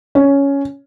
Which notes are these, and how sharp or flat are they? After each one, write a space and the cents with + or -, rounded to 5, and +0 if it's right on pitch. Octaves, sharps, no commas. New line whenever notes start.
C#4 +10